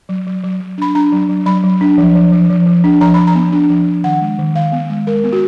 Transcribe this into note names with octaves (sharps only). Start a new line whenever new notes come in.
F#3
F#3
F#3
F#3
D4 B5
D4 A#5
F#3
F#3
F#3 B5
F#3
D4
F3
F3
F3
F3
F3
D4
F3 A#5
F3 B5
A#5
B3
D4
F3
F3
D#3 F#5
G#3
D#3
D#3 F5
B3
G#3
G#3 A#4
B3
F#4